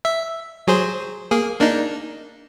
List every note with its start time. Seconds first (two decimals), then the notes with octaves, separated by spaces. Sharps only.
0.05 E5
0.67 F#3 G#4 C5
1.31 A#3 G#4
1.59 A#3 D4 D#4